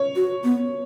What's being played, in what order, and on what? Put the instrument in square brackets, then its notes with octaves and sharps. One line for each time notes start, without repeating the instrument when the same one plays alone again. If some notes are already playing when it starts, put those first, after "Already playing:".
Already playing: [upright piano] C#5
[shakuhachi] F#4
B3